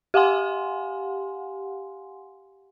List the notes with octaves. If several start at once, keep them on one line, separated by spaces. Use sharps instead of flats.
G4 F5 F#5 G#5 C6